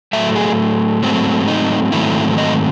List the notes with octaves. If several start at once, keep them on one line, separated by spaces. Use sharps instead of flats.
A2 F#3 A3 E5
G#4
G#2 F#3 A3 C4
D#4
G#2 D#3 F#3 A3 C4 E4
D#5